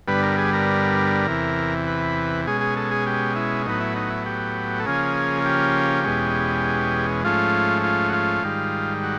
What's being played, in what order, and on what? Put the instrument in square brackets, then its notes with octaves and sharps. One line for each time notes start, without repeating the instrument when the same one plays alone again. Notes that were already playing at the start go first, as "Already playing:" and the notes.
[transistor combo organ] G2 D3 G3 B3 B4
A#4
G#4
A#4
E2 C3 E3
B4
B2 G#3 C#4 G#4
G#4
A4
G#4
G4
E4
A2 F#3 B3 D#4
E4
D#4
E4
G4
A4
C#3 F3 A#3 C#4 G#4
G4
E2 B2 G#3 C#4
G#2 F3 A3 C#4 F4
F4
F#4
F4
G#2 D#3 G3
F#4